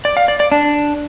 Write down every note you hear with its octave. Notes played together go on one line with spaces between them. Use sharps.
D5
F5
D5
D5
D4